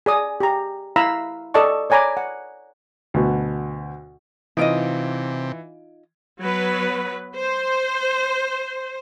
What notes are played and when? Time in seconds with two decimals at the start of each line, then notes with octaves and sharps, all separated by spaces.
0.06 G#4 D5 D#6
0.40 G4 A#5
0.96 E4 F5 A#5 B5 E6
1.54 A4 D5 D#5 A5 C#6
1.90 C#5 D5 G#5 A#5 B5 D6
2.17 F#5
3.14 D2 B2
4.57 C3 E3 D#4 F4 D#5 D7
6.40 F#3 B3 B4
7.36 C5